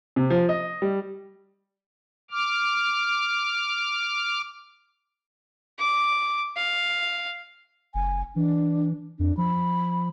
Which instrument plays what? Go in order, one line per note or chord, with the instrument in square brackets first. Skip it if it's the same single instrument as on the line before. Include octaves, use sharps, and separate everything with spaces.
[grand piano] C3
F3
D#5
G3
[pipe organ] D6 F6
[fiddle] D6
F5
[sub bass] F#1 [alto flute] G#5
[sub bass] E3 [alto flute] D4
[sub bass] F2 [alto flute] D4
[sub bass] F3 [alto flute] B5